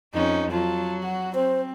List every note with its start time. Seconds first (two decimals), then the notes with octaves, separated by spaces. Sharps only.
0.14 F2 C#4 D#4
0.51 F#3 F4 A5
1.03 F#4
1.34 C4 C5